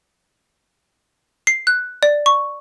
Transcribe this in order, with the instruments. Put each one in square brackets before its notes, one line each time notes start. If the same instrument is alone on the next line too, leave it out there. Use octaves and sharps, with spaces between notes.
[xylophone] C7
F#6
D5
C#6